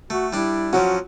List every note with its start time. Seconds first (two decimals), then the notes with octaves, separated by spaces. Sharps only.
0.10 A3 F#4
0.33 G3 D4 E4
0.73 F3 F#3 C#4 F#4